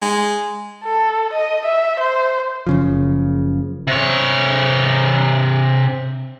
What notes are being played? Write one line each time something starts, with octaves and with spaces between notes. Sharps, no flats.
G#3
A4
D#5
E5
C5
F#1 C#3 F3
C3 C#5